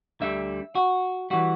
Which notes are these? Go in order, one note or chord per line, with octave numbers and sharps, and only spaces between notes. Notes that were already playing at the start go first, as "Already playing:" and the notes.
D2 D3 G3 E5
F#4
E3 G3 F#4